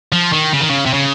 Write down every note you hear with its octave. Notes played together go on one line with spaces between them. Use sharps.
F3
D#3
C#3
D#3
C#3
C3
C#3